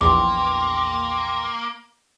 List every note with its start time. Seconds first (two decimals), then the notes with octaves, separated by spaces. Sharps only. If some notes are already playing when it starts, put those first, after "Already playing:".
0.01 A#1 E2 A#3 G5 C6 D6